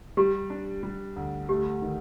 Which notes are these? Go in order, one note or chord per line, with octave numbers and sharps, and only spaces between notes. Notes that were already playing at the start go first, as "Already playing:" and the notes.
G3 G4
D4
G3
D2
A3 G4
D#3